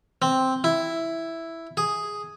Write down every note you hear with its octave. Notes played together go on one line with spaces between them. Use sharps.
C4
E4
G#4